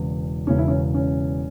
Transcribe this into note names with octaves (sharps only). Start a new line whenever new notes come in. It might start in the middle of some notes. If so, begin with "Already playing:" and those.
Already playing: E1 E2 C#3 E3
E1 E2 C#3 C#4
E4
C#4
C#4